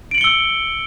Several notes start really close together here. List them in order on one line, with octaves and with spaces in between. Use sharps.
D7 F#7 C#7 G7 E6